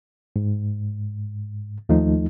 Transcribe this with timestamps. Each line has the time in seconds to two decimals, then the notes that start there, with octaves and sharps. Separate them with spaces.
0.36 G#2
1.89 D#2 F3 A3 D#4